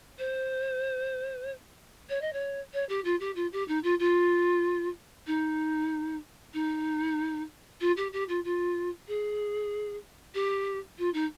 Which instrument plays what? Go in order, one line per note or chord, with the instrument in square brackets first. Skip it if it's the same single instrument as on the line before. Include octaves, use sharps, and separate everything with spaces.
[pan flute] C5
C#5
D#5
C#5
C#5
G4
F4
G4
F4
G4
D#4
F4
F4
D#4
D#4
F4
G4
G4
F4
F4
G#4
G4
F4
D#4